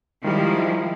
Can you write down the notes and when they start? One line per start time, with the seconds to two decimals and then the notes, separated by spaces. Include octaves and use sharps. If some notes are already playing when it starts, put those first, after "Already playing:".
0.24 D#3 F3 G3 G#3 E4